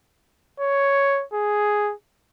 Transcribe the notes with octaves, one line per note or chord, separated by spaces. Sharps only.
C#5
G#4